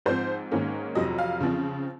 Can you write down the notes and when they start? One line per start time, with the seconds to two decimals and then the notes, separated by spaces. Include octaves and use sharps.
0.06 G#2 F3 C4 C5
0.52 G#2 D#3 A#3 C#4
0.95 F2 C3 F#3 D#5
1.18 F5
1.41 C#3 F3 C4